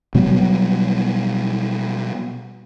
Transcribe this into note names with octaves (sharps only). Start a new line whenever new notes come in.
B2 F#3 G3 B3